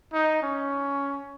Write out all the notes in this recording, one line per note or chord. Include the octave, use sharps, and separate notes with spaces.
D#4
C#4